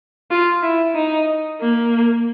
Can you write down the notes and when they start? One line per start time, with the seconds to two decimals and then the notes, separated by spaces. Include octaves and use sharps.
0.31 F4
0.63 E4
0.95 D#4
1.62 A#3